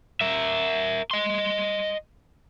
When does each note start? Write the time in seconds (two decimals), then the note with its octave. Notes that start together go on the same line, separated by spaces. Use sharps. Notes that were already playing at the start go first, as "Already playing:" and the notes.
0.21 A#4 E5
1.11 D#5 C6